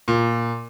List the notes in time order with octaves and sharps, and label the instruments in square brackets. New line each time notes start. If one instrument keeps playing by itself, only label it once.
[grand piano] A#2